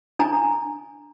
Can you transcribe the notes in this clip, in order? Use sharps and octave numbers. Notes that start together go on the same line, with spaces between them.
D4 G#5 A#5